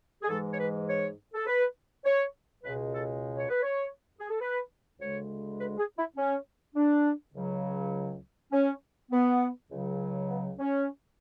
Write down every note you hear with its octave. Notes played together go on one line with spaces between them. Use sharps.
G#4
G#2 E3 G#3 A4
C#5
B4
C#5
A4
B4
C#5
C#2 B2 G#3 B4
A4
C#5
B4
C#5
G#4
A4
B4
D2 C#3 G#3 C#5
B4
G#4
E4
C#4
D4
C#2 C#3 F#3
C#4
B3
C#2 C#3 F#3
B3
C#4